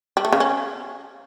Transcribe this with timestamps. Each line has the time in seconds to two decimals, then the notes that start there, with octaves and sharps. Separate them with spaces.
0.17 G3
0.25 A3
0.33 C#3
0.40 C#4